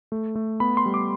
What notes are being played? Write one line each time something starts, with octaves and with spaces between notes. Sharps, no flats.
A3
A3
B3 B5
C6
G3
D6